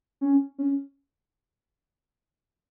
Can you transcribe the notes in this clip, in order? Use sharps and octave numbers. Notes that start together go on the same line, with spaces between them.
C#4
C#4